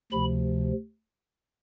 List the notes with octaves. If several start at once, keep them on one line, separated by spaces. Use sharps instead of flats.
D2 C3 F3 B5